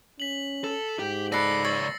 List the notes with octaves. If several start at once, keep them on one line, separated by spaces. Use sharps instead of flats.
C#4 B6 F#7
A4
G#2 G4
C#2 A4 B4 D5 A#6 C7 C#7
C#5 E6 A6